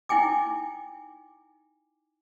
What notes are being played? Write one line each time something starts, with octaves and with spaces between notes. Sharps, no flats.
D#4 E4 G5 G#5 D6